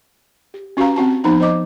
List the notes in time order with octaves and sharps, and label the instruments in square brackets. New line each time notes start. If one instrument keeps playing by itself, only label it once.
[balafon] G4
C#4 F#4 G4 B4 F5 A#5
C4 F#4 A5
F3 B3 D#4 A#5
C5 D#5 D6